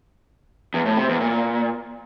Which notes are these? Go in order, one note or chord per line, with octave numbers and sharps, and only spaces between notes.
E2
A2
C3
E2
A#2